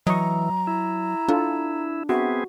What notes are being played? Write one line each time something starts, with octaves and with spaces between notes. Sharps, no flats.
E3 F#3 D#5 A#5 C#6
E4
D4 F4 A4
B3 C4 F#4 G#4 E5